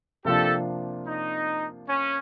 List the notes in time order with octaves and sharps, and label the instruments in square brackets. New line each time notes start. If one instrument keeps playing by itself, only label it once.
[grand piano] C3 F3 A#3 D4 F4 [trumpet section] G4 A4
[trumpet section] D#4
C#4